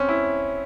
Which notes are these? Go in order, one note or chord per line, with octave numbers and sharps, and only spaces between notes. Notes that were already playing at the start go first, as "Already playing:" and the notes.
Already playing: C4 C#4
E4